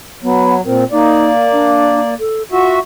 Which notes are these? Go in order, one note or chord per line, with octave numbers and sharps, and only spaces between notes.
F#3 B3
A#2 C4 A#4
A#3 D#4 D5
D4
A4
F4 F#4 E5